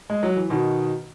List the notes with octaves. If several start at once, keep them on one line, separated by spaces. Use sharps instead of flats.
G#3
F#3
E3
B2 D#3